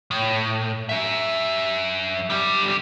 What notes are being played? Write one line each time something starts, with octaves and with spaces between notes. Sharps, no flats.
A2
F#2 E5
D3 G3